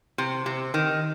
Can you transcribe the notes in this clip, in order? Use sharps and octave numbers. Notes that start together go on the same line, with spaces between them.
C3
C3
D#3